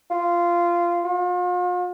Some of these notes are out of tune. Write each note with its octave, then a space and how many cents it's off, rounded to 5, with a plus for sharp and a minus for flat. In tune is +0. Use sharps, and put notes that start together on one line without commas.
F4 -15
F4 +40